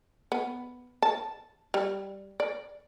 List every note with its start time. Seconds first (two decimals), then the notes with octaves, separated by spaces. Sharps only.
0.32 B3
1.02 A5
1.74 G3
2.40 D5